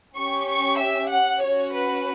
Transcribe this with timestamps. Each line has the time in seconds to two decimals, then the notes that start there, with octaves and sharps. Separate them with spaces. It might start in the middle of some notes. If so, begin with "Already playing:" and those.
0.15 C#4 G4 C#6
0.48 C#6
0.78 E5
1.10 F#5
1.41 C#4 F#4 C#5
1.73 B4